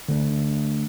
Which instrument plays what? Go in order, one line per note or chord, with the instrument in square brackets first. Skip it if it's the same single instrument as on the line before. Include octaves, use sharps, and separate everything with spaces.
[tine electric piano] D3 A3 D4